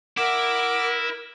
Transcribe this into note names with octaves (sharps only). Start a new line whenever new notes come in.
E4 A#4 E5 F#5 D6